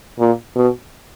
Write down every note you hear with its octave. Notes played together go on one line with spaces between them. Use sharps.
A#2
B2